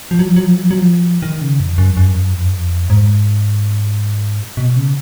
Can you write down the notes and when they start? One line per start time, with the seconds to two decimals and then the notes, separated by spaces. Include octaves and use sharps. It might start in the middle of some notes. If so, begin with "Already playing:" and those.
0.11 F3
0.19 F#3
0.28 F3
0.36 F#3
0.45 F3
0.53 F#3
0.62 F3
0.71 F#3
0.79 F3
1.22 D#3
1.41 C#3
1.60 F2
1.78 F#2
1.90 F2
1.97 F#2
2.11 F2
2.15 F#2
2.34 F2
2.44 F#2
2.54 F2
2.90 G#2
4.57 B2
4.76 C#3